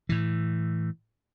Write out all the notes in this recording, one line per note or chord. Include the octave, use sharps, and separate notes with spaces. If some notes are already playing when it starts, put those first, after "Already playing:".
A2 E3